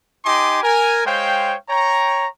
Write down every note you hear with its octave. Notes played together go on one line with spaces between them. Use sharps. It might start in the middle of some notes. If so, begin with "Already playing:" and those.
D#4 G4 D#5 G#5 C6 D6
A#4 G#5
G#3 C5 C#5 F5 G5
C#5 G5 A#5